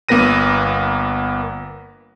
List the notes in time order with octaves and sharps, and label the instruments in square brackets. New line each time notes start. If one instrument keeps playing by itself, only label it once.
[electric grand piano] G1 A#3 B3 B4 A#6 D#7